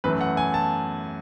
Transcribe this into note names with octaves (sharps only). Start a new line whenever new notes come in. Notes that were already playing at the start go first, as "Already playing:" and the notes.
F#2 E3 A3 B4
F#5
G#5
A5